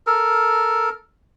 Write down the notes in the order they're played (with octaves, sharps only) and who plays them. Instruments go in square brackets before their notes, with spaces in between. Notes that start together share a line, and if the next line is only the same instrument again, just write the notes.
[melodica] A4 A#4